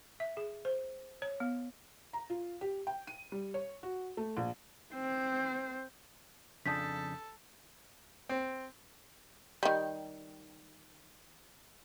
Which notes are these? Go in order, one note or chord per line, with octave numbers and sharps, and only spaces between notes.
E5
G#4
C5
C#5
B3
A#5
F4
G4
G5
D#7
G3
C#5
F#4
A3
A#1
C4 C5
F2 C#3 D4 A4 D#6 G6 B6
C4
D#3 G3